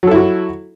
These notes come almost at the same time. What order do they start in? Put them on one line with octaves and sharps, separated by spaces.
F#3 A4 E4 F#4